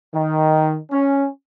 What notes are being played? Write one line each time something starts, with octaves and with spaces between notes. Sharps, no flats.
D#3
C#4